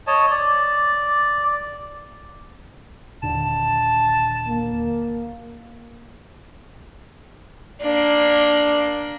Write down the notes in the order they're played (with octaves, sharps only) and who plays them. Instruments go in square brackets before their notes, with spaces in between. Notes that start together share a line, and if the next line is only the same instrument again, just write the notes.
[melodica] C#5 D#5 A5
D5
[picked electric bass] D#1 D3 [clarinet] A5
[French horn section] A#3
[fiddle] A#3 D4